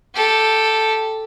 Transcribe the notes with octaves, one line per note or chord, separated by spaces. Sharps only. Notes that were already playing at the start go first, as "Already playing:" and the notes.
G4 A4